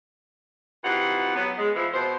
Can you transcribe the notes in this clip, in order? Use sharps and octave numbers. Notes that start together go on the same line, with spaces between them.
C3 E3 D#4 F4 F#4 F#5
F#3 B3
G#3
E3 F3 E4
B2 C5